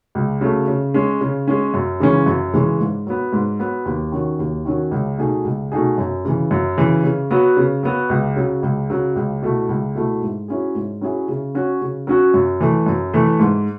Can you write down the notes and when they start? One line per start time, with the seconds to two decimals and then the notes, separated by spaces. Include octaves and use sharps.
0.15 C#2
0.41 C#3 F#3 A3
0.68 C#3
0.94 G#3 C#4
1.21 C#3
1.47 G#3 C#4
1.74 F#2
2.00 C#3 E3 G#3 C#4
2.26 F#2
2.54 C#3 E3 G#3 C#4
2.80 G#2
3.07 F#3 B3
3.33 G#2
3.59 F#3 B3
3.85 D#2
4.12 D#3 F#3 C#4 F#4
4.39 D#2
4.65 D#3 F#3 C#4 F#4
4.91 C#2
5.18 B2 A3 D#4 G#4
5.45 C#2
5.72 B2 A3 D#4 G#4
5.98 F#2
6.25 C#3 E3
6.51 F#2
6.77 C#3 E3
7.04 C#3
7.31 F#3 B3 F#4
7.57 C#3
7.83 F#3 B3 F#4
8.10 C#2
8.36 C#3 F#3
8.63 C#2
8.90 C#3 F#3
9.16 C#2
9.42 B2 A3 E4
9.69 C#2
9.95 B2 A3 E4
10.22 G#2
10.48 F#3 C#4 E4 G#4
10.75 G#2
11.01 F#3 C#4 E4 G#4
11.28 C#3
11.55 F#3 C#4 F#4
11.81 C#3
12.07 F#3 C#4 F#4
12.34 F#2
12.60 E3 A3
12.86 F#2
13.14 E3 A3
13.40 G#2